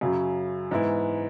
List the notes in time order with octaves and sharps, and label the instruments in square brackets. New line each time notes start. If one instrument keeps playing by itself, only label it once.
[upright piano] F#2 C#3 F#3
G#2 E3 B3 E4